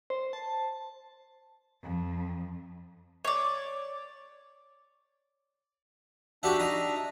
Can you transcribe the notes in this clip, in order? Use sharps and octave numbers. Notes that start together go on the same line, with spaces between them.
C5
A5
F2
C#5 D5
D4 F#4 G4 E5 F#5
D#4 A#5